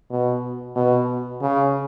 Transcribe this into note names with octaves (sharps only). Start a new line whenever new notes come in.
B2
B2
C#3